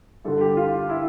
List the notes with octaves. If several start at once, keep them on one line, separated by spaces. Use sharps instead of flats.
G2 D3 A4
G4
F4
E4